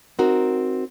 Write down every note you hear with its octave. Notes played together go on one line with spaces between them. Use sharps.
C4 D#4 F#4 A#4